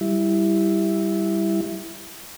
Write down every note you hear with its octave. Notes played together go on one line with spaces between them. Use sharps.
G3 E4